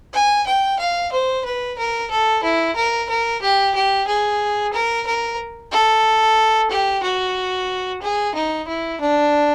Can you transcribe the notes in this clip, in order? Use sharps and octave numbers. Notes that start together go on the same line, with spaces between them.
G#5
G5
F5
C5
B4
A#4
A4
E4
A#4
A#4
G4
G4
G#4
A#4
A#4
A4
G4
F#4
G#4
D#4
E4
D4